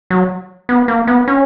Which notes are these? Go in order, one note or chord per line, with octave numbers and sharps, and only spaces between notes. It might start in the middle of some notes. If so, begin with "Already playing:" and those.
F#3
B3
A#3
B3
C#4